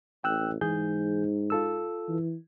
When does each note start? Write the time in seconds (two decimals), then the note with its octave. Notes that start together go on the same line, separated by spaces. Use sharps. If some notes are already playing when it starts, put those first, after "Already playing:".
0.24 A1 G5 E6 F#6
0.61 G#2 E3 G#4 G6
1.50 F4 A4 E6
2.08 E3